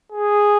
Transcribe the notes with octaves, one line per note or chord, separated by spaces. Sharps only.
G#4